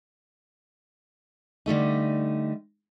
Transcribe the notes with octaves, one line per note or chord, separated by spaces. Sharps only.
D3 G3 A3 D#4